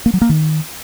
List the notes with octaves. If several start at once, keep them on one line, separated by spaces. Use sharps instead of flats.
A#3
F#3
A#3
D#3